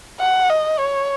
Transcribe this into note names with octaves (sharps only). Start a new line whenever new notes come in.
F#5
D#5
C#5